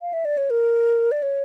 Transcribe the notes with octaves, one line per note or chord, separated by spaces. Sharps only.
F5
E5
D5
C#5
A#4
D5
C#5